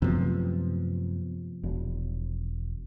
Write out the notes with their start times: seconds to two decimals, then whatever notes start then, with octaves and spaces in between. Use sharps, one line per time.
0.02 F#2 C3 F3 A3 B3
1.63 E1